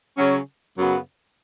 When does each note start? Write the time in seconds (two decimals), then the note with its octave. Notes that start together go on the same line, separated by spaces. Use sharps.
0.18 C#3 F#3 C#4
0.77 F#2 C#3 F#3 B3